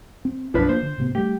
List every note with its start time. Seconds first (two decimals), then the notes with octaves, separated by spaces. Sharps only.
0.25 C4
0.54 B1 F#2 F3 D4 B4
0.69 A#3 C5
0.82 D3
0.98 A2 C3 B3
1.15 G3 A3 G4